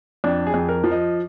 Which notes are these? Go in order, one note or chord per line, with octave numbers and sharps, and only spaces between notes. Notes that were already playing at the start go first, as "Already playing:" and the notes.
F2 D4
G#4
F2
A#4
F3
D#5